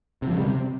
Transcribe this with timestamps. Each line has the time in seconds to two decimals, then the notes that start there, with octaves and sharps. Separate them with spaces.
0.22 C3
0.27 F3
0.33 C#3
0.38 G3
0.43 C3